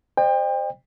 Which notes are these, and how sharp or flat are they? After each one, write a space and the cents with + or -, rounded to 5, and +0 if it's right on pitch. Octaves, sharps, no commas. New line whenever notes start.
C5 +0 D#5 -45 G5 +30